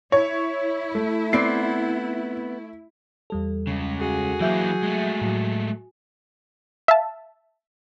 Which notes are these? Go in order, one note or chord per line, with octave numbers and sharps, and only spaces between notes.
E4 C#5
A3
B3 C4 D5 C7
E2 G3 A4
C#2 C#3
F#4 G#4
E3 F#3 A#3 E5 G6
G#3 A3
A2 F#3
E5 F5 A5